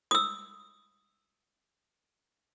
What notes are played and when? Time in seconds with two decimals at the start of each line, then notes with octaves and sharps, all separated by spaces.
0.11 D#6 E6